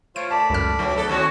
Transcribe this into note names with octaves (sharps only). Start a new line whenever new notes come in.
A3 F4 C5 C#5 D7
D5 A5 B5
C#2 F#2 F6
D2 F#3
B3 A4
D#2 C#4 F#4 C#5 C#6 D#6